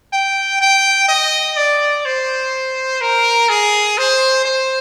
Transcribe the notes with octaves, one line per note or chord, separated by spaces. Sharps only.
G5
G5
D#5
D5
C5
A#4
G#4
C5
C5